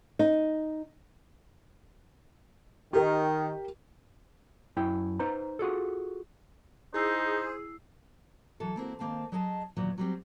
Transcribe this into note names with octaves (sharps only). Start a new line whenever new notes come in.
D#4
D#3 G4 A#4
F#2 E4 G5
D#4 B4 C5 A#5
F4 F#4 G#4 A4
D#4 E4 G#4 C5 E6 C7
E3 F#3 A4
A#3 C4 E4 F#4
D#3 E3 A#3 C4 F5 A5
F#3 G#4 C#5 D#5 A5
E2 A#2 D#3 F#3 D#4
F#3 G3 C4